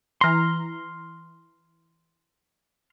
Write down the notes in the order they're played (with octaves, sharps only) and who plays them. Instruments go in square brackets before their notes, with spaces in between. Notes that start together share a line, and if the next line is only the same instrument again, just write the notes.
[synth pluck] E3 A#5 [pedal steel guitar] C6 F6